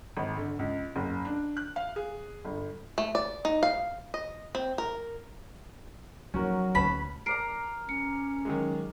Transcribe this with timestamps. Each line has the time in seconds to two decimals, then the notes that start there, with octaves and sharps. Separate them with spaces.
0.17 G#1
0.37 D3
0.59 C#2
0.96 F#1
1.25 D4
1.57 F#6
1.76 F5
1.96 G#4
2.45 G1
2.98 A3
3.15 D5
3.45 D#4
3.63 F5
4.14 D#5
4.55 C4
4.78 A#4
6.34 F3 F#3 C#4 D#4 F#4 A#4
6.75 D2 C#4 B4 A5 B5
7.26 A#4 D5 A#5 C7 D7
7.89 C#4 C#7
8.45 D#3 F#3 G#3